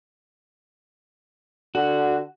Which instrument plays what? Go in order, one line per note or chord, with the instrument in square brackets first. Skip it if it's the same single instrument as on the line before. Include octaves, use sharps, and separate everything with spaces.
[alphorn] D3 [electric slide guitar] F#4